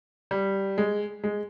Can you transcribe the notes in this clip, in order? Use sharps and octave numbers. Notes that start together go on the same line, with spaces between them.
G3
G#3
G#3